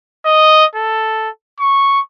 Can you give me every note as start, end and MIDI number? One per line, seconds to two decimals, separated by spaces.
0.25 0.65 75
0.75 1.29 69
1.60 2.00 85